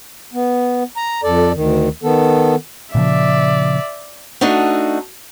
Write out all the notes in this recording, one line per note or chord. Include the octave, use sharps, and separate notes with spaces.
B3
A#5
F2 A4 D5
D2 D#3
D#3 B3 A4
A#2 C#3 F3 D5 E5
A3 D4 D#4 F#4